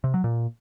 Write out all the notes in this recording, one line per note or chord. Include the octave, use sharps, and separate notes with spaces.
C3
F#3
A#2